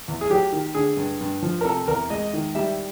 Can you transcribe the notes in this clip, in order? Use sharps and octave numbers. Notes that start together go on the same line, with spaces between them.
E2
G#4
F#3 G4
D#3
D3 G#4
G2
G2
F3
A#4
C3 A4
E2 A#4
G#3 D#5
D#3
G3 E5